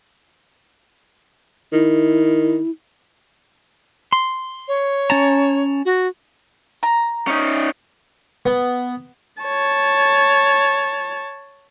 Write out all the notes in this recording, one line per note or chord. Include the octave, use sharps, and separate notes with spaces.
D#3 E4
C6
C#5
C#4 A5 A#5
F#4
A#5
C#4 D#4
B3
C#5 A5